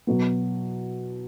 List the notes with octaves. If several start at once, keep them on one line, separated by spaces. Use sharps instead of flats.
B2 F#3 B3